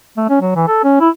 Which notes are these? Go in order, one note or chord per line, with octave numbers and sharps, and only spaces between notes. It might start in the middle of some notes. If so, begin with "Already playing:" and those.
A3
C#4
F#3
E3
A4
C#4
E4